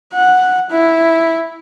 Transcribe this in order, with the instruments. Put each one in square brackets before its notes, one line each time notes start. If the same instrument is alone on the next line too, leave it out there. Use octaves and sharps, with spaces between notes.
[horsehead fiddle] F#5
E4